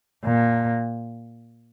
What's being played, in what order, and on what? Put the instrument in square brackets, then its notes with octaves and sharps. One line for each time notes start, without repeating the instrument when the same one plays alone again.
[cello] A#2